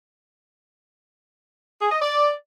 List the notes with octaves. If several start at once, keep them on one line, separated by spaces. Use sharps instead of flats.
G#4
D#5
D5